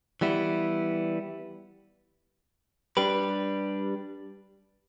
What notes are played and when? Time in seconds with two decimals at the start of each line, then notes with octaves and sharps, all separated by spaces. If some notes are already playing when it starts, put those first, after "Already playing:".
0.21 E3 G3 B3 E4
2.97 G3 D4 G4 B4